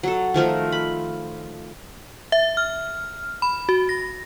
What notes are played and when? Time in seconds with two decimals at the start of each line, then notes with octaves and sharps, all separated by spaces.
0.03 F#3 A4
0.34 D#3 F3 A3 A#4
0.72 B5
2.32 E5
2.57 F6
3.42 B5
3.69 F#4
3.89 A#6